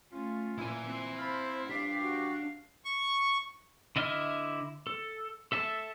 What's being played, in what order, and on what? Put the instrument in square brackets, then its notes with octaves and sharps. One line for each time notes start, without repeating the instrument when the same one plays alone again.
[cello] A3 C#4 [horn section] F4
[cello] A#2 [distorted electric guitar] E4 G#5
[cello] C4
[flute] C5 [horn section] F5 A5 B5
[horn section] G2 F3 G4 [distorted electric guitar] D4 [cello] F5 [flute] B6
[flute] F#4
[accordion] C#6
[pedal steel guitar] D3 E4 D#5 E5 F6
A4
A4 E5 A5